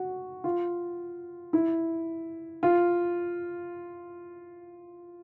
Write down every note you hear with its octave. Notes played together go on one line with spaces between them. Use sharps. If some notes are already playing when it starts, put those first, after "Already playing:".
Already playing: F#4
F4
E4
F4